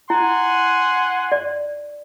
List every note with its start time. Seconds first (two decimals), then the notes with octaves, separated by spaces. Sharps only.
0.10 E4 F#5 G#5 C6
1.32 D5